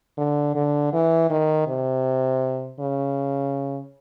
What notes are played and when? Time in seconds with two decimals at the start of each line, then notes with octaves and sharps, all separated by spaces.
0.18 D3
0.55 D3
0.93 E3
1.30 D#3
1.67 C3
2.80 C#3